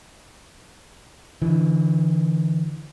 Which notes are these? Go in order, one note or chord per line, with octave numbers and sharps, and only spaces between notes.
D3 E3